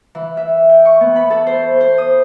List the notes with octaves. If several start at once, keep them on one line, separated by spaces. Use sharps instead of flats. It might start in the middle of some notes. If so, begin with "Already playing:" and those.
E3
E5
G5
C#6
B3
B5
A4
C5
C5
D#6